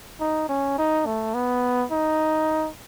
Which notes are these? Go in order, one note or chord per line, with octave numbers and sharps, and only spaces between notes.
D#4
C#4
D#4
A3
B3
D#4